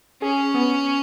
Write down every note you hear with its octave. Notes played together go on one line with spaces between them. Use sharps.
C#4 G#4
B3